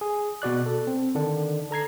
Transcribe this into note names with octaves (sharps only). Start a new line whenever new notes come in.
G#4
B2 F#4 D5 F#6
A4
C4
D3 D#3 D4
A4 A#5 G#6 C7